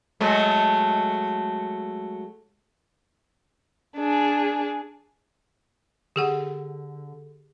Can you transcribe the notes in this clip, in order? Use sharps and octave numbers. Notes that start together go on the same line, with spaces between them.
F#3 G#3 A3
D4 G#4
D3 G4 G#4 F#5